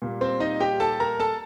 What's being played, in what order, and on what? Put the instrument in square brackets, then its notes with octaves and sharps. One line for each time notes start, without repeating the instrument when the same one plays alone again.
[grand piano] A#2 G3 A#3
C4 C5
D#4 D#5
G4 G5
A4 A5
A#4 A#5
A4 A5